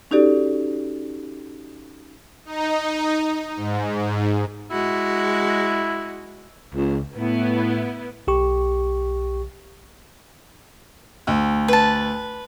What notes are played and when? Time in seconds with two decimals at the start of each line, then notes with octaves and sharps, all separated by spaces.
0.11 C#4 D#4 F#4 G4 A4 D5
2.45 D#4
3.56 G#2
4.71 G#3 E4 F#4
6.74 C#2
7.17 A2 B3 E4
8.27 B1 G4 C#6
11.27 D2
11.68 B4 A5